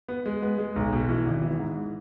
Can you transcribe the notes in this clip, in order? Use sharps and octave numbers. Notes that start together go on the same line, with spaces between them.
B3
G#3
B3
G#3
B1
B2
E3
G#1
E3
G#2